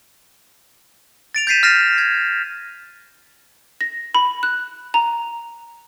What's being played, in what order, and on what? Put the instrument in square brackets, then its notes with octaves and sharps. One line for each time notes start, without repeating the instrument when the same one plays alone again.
[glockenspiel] A6 D7 F7
G6 A6 B6 C7 D#7 E7
F6 A6 A#6 C7 D#7 E7
G#6
[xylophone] A#6
B5
F#6
A#5